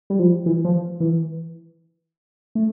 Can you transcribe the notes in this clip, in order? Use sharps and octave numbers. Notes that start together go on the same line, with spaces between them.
G3
F3
E3
F3
E3
A3